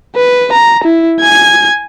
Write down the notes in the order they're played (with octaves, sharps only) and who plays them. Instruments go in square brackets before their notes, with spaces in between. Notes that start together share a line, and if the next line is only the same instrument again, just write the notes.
[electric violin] B4
A#5
E4
G#5 G#6